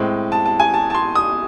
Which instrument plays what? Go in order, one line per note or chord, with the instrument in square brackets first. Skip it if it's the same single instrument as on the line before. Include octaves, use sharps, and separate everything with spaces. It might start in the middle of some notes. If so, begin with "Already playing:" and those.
Already playing: [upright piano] A2 G#3 C4
A5
A5
G#5
A5
A5
C6
D#6